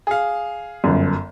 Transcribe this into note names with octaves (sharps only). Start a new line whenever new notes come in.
G#4 F5
G1 F#2